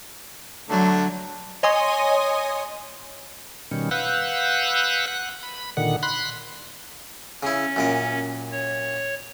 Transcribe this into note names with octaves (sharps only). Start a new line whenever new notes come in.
D3 F#3 A3 D4
C#5 D#5 G#5 C6 D#6
B2 D#3 G3 C#4
B4 F5 F#5 E6 F#6 G6
F#5 F#6
B5
A#2 D3 D#3 F#5
B5 C6 F#6
C#3 C#4 E4
F#2 A#2 A#4
C#5